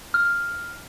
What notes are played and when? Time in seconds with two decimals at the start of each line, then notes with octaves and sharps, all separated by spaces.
0.14 F6